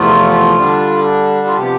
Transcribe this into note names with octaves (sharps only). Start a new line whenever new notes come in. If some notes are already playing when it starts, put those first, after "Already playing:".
Already playing: E2 C3 F3 A3 F4
D3 G3 D4
F4
C3 F3 B3 G4